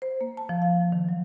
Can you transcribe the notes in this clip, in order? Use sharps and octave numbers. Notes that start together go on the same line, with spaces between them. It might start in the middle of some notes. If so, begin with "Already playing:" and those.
C5
A#3
A5
F3
F5
D#3
F#3